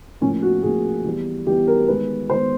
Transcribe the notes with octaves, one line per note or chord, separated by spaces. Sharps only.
A2 F3 A#3 C#4
F#4
A2 F3 A#3 G#4
E3 G3 B3
E3 G3 B3 G4
A#4
D#3 G#3 B3 B4
D#3 G#3 B3 C5